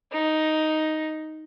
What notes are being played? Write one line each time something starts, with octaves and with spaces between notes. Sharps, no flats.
D#4